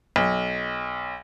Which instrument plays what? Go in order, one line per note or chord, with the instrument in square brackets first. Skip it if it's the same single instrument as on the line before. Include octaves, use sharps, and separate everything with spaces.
[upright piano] B1